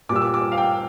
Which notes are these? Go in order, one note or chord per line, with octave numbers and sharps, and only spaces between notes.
A#2 G3 D6 E6
D6
D6
F5
G5